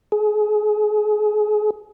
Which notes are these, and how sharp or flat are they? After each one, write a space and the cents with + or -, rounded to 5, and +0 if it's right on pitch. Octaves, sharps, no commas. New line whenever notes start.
G#4 +30